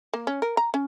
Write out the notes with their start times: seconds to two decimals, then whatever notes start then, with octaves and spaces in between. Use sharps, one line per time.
0.13 A#3
0.27 C#4
0.42 A#4
0.57 A#5
0.74 C#4